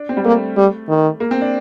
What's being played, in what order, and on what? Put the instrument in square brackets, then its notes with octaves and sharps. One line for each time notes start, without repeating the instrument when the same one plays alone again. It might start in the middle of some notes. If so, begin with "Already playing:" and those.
Already playing: [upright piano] D4
C4
G3
[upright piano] A3 [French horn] A#3
[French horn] G3
D#3
[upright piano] A#3
C4
D4